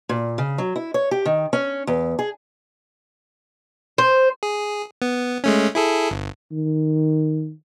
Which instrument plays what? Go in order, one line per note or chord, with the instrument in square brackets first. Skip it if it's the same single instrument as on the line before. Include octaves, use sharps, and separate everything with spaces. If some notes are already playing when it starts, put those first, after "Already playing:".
[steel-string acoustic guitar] A#2
C#3
F#3
E4
C#5
G4
D#3
C#4
E2
G#4
[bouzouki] C5
[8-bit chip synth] G#4
B3
G#3 A3 C#4
E4 G#4 A4
G1
[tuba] D#3